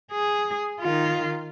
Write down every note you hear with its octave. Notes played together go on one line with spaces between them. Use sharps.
G#4
D#3 F4